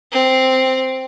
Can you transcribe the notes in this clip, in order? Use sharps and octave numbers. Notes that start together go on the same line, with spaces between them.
C4